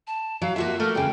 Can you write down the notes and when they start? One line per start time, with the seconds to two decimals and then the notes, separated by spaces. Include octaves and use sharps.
0.07 A5
0.42 F#3 F5
0.56 A#3 F4 F#4 E5
0.79 A3 A4 A#4 F6
0.95 E2 C#3 G5